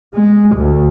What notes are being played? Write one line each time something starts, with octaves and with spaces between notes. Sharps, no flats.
G#3
D2